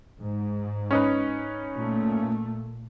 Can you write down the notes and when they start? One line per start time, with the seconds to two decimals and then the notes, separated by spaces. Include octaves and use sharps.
0.22 G#2
0.91 C#4 D#4 B4
1.76 A#2 A3